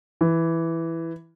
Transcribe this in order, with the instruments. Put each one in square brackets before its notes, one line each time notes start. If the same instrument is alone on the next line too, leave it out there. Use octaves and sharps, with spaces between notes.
[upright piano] E3